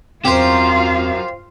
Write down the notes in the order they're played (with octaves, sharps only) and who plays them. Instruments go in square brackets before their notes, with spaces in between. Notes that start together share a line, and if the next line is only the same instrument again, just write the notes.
[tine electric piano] E2 C4 [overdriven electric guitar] F#3 A#4 [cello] F4 F5 [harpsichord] G4 C5